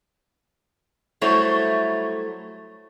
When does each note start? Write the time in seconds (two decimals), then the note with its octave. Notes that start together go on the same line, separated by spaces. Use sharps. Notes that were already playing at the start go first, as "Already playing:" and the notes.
1.21 F#3 G3 A3 E4 C5 C#5